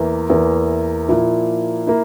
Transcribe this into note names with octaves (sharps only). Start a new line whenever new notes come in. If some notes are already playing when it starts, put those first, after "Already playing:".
Already playing: E2 E3 A#3
E2 E3 A#3
A#2 F3 A#3 E4
A#3 E4